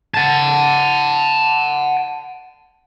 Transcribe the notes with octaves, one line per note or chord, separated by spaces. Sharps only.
F#5 A5